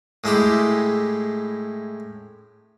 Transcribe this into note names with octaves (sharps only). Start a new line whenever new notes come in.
A2 G#3 E4 G4